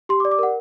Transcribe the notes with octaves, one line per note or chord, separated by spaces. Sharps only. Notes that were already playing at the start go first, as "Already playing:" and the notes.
G4 C6
D6
D5
D6
A#4 F#5